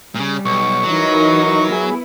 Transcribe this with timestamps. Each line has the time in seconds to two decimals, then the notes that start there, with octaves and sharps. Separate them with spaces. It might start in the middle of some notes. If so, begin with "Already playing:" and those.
0.15 A#2 C#3 G3
0.45 B1 C#6
0.84 E3 F#3 D#4 A#4
1.72 B3 E4 G#4